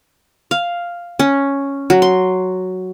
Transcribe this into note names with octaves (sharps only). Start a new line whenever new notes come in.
F5
C#4
F#3
C6